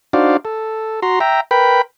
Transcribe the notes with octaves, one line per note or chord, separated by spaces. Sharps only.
D4 D#4 F#4 C5 D5 F5
A4
F#4 A#5 C6
E5 G5 A#5
A#4 B4 G5 B5